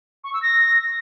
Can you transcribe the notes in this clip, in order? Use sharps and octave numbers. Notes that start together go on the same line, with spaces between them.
C#6
E6
A#6